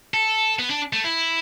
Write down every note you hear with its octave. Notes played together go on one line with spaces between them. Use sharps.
A4
B3
D4
A3
E4